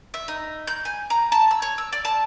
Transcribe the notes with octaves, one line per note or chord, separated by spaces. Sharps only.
E5
D#4
G6
G#5
A#5
A5
E6
C#5
E6
D5
A5